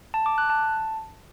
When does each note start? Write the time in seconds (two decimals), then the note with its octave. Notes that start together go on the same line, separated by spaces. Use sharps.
0.14 A5
0.26 D6
0.38 F#6
0.50 A5